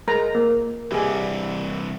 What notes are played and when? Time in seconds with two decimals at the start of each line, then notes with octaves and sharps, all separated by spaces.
0.08 G#3 A#4 A#5
0.35 A#3
0.92 C2 E3 G4 G#4